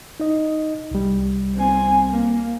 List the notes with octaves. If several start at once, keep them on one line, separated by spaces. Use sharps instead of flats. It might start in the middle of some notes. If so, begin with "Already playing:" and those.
D#4 D#5
C2 G3
C4 G#5
A#3